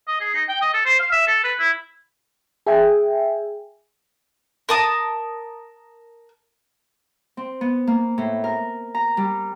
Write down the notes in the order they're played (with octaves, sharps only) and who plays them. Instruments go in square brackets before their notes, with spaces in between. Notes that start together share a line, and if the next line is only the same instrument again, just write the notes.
[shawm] D#5
G#4
D#4
G5
D#5
A4
C5
F5
E5
A4
B4
E4
[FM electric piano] G#4 E5 G5 G#5
[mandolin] A#4 A5 D#6
[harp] C4
B3
A#3
A2
A#4
A#5
G3